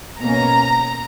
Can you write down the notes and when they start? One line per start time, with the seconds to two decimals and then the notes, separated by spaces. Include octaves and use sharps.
0.21 B2 A#3 C#4 A#5